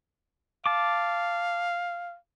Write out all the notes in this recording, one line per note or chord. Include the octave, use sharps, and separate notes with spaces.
F5 A5 D6